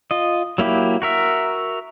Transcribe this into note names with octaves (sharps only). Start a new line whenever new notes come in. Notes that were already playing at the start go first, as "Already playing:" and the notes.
F4 D#5
F#3 A#3 E4 G4
F#4 A#4 E5